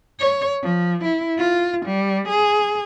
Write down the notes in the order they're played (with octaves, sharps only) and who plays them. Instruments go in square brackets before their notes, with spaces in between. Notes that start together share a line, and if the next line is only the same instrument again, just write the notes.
[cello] C#5
F3
E4
F4
G3
G#4